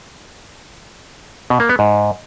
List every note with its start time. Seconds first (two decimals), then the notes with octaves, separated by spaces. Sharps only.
1.50 B2
1.60 A#3
1.69 B3
1.79 G#2